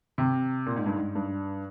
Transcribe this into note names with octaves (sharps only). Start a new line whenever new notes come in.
C3
A#2
G#2
G2
G#2
G2